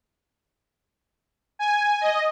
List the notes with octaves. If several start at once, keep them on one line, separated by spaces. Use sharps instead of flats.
G#5
D#5